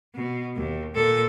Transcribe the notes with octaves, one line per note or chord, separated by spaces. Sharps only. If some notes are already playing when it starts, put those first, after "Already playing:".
B2
D#2
A#2 A4